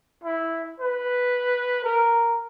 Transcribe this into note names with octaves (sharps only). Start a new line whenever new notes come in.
E4
B4
A#4